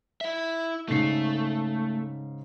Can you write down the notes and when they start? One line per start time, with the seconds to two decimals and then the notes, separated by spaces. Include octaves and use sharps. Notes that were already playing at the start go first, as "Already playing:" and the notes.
0.21 E4 E5
0.88 G#2 C#3 A3 C7